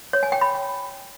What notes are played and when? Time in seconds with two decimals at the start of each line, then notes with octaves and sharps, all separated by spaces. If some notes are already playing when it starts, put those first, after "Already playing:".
0.13 C#5
0.23 G#5
0.32 G5
0.41 B5